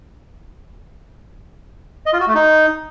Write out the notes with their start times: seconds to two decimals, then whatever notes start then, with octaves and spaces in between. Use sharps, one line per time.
2.06 D#5
2.13 F4
2.20 F#4
2.28 A3
2.35 D#4